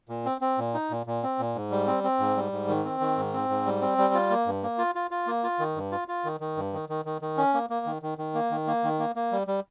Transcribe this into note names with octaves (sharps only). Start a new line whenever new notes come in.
A#2
C4
C4
A#2
D#4
A#2
A#2
C4
A#2
G#2
G3
C4
C4
G#2
G3
G#2
D#3
C4
D#3
G#2
C4
G#2
G3
C4
G3
F4
A#3
G2
A#3
F4
F4
F4
A#3
F4
D#3
G2
F4
F4
D#3
D#3
G2
D#3
D#3
D#3
D#3
C#4
A#3
A#3
D#3
D#3
D#3
A#3
D#3
A#3
D#3
A#3
A#3
G3
G3